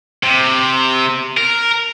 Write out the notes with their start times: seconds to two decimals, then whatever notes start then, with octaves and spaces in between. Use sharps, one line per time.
0.23 C3
1.37 A#4